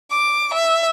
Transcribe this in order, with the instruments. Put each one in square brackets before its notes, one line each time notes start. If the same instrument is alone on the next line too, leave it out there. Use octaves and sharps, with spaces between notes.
[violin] D6
E5